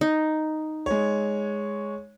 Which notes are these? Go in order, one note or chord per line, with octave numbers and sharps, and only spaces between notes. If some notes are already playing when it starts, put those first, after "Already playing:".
D#4
G#3 C#5